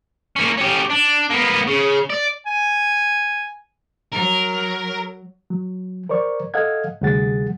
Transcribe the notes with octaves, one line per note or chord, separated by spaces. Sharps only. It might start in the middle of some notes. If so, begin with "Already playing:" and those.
A#3 C#4
C#4 G4
D4
A#3 B3
C#3
D5
G#5
F#3 A#4
F#3
A#4 C5 D5 C#6
A4 D#5 F5 F#5 G#6
D2 C3 G3 G#4 F#5 A6